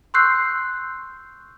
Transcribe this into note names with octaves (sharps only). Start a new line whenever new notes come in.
C6 C#6 E6 F#6 G6 C7